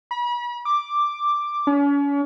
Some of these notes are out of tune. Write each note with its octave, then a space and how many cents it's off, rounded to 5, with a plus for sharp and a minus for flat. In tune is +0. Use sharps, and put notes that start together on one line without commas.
B5 -40
D6 +5
C#4 +40